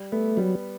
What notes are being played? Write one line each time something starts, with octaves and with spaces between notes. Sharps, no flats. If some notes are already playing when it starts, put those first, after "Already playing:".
Already playing: G3
A3 B3
F#3 G3